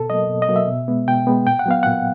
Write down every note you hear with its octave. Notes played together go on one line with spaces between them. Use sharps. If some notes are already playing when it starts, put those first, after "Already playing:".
Already playing: B2 A4
F#3 A#3 D#5
B2
D#5
F#3 A#3
E5
B2
G#3 B3
B2 G5
G#3 B3
A#2 G5
F#5
F#3 B3 F5
A#2 F#5